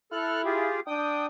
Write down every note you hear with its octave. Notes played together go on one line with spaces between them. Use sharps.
E4 A4 F6 F#6
F4 G4 G#4
D4 G5 D#6